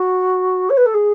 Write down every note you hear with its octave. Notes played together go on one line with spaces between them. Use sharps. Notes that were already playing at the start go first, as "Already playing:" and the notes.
Already playing: F#4
C#5
B4
A4
G#4